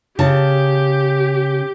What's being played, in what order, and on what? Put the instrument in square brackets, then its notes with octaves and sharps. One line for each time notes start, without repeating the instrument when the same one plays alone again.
[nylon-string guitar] C#3 A5 [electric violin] G4